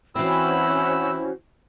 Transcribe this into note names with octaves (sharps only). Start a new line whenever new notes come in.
E3 C4 C#4 E4 F#4 C5 E6